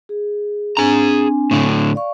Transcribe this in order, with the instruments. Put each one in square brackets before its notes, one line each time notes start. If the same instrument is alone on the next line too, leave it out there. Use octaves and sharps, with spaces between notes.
[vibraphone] G#4
[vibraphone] C4 D4 G#5 [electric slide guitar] G#4 A#5
[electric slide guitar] A2 D3
[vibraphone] D5 F5 C#6